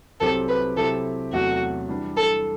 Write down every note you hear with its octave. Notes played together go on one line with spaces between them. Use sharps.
C2 C3 F#3 C4 G4 A4
B4
C3 F#3 C4 E4 G4 A4
E2 C3 F#3 A3 F#4
E3 G3 D4
A4